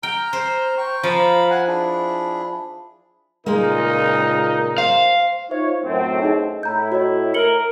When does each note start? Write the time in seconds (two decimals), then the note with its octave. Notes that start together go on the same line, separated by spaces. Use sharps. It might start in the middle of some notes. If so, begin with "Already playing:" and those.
0.03 G5 A#5 F6
0.33 C5
0.78 G5 C#6
1.03 F3 F5 A#5 B5
1.50 F#5 G#5
1.67 D4 E4 G#4
3.46 C#2 A#2 G#3 A#3 D#4 A#4
4.78 C5 F5
5.51 D#4 F4 C5 C#5 E5
5.83 F#2 A2 C4
6.22 D#4 G#4 D#5
6.63 A2 E4 A#5 G6
6.92 F#4 C#5 D#5
7.34 A#4 C#7 F#7 G7